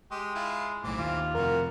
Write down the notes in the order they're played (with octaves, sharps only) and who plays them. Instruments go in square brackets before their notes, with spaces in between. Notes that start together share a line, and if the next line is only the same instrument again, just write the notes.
[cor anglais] G#3 [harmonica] G4
[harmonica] E4 F4
[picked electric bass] B1 A2 [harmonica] E3 C4 D6
[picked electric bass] D#2 [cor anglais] F4
[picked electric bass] F2 C3 [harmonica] E3 F#4 [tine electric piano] A#4